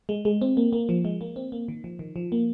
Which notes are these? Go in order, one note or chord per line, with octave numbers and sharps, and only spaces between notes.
G#3
G#3
C4
A#3
A#3
F3
G#3
A#3
C4
A#3
D#3
F3
D#3
F3
A#3